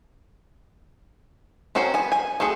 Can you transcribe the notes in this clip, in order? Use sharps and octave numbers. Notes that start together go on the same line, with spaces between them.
C4 C#4 F#4 A#4 C5
B3 G#5
G#5
A3 C4 F#4 G#4